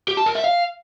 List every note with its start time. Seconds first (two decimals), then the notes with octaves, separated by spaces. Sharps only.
0.08 G4
0.17 A5
0.26 A#4
0.35 E5
0.44 F5